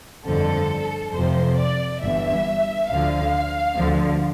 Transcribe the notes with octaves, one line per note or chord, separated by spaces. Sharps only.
G1 F2 D3 F3 A4
F2 C3 F3 C5
D5
G1 G2 E3 E5
D2 D3 F3 F5
D2 D3 F3